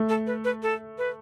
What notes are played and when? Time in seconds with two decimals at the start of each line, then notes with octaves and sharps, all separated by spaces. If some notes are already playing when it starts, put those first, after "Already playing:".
Already playing: A3
0.09 A4
0.27 B4
0.44 B4
0.63 A4
0.98 B4